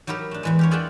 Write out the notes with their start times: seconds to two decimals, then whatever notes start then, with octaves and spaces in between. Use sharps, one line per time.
0.07 F#3 D#4 E4 G4 A#4
0.31 A3 D4
0.43 E2 E3 G#3
0.59 G4 A#4 C#5
0.71 F4 G#4 D5 E5 F#5 G5